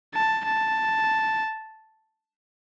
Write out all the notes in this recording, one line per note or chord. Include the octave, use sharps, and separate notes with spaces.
A5
A5